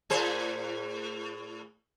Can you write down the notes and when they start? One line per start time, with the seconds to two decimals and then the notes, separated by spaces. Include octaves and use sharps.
0.10 A2 G#4 C5